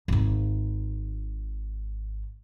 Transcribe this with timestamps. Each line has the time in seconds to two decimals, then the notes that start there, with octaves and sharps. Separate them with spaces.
0.08 G#1 D#4